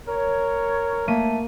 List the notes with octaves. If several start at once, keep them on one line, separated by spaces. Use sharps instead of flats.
A#4 C#5
A3 A#3 B6 D#7